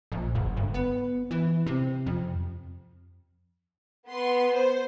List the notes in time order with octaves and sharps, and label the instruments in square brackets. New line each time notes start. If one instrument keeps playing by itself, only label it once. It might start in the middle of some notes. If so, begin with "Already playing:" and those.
[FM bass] A#1
F#1
G1
B3
E3
C3
F2
[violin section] B3 C6
C5